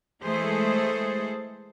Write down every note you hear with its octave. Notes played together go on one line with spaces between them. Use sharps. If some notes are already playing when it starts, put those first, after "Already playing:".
E3 G#3 A3 G#4 A4 C5